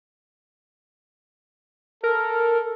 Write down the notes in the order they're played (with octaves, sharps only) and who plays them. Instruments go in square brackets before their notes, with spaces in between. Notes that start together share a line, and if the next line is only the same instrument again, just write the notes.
[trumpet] A4 [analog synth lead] A#4